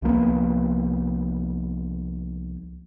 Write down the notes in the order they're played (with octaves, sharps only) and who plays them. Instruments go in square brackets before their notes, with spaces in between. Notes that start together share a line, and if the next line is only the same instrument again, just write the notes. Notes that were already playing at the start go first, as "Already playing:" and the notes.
[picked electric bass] C2 F3 A#3 B3